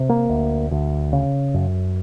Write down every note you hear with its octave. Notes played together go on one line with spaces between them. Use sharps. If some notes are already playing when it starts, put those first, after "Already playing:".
Already playing: C3
A#3
D2
D2
C#3
F#2